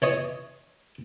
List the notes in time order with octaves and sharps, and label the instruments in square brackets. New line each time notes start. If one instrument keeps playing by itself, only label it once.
[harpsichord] E3 C#5 D#5